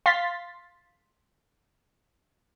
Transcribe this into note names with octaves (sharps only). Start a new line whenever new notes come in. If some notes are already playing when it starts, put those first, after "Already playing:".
F5 C6 A6 B6